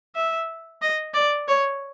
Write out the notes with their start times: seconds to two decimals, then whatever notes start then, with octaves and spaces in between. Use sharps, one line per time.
0.15 E5
0.82 D#5
1.14 D5
1.48 C#5